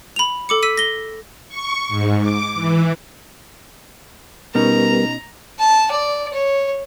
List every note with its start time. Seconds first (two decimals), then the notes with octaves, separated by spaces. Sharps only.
0.16 B5 F7
0.49 A4 D6 C#7
0.63 E6 B6 D#7
0.77 A#6 G7
1.48 C#6
1.89 G#2
2.21 D6
2.55 E3
4.55 B2 G3 B3 C#4 D#4 A#4 A#5
5.59 A5
5.91 D5
6.33 C#5